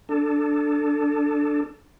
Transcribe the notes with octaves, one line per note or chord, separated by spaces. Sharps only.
D4 A4